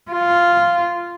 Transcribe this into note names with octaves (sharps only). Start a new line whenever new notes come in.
F4